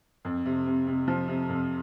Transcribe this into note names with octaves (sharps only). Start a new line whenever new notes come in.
F2
C3
C3
C3
F3
C3
F2